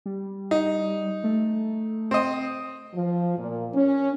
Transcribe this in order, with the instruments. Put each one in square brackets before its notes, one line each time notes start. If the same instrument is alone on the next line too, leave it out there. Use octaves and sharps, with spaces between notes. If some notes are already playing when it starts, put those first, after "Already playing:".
[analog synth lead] G3
[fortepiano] D#4
[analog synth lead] A3
[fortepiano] C4 D#5
[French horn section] F3
A#2
C#4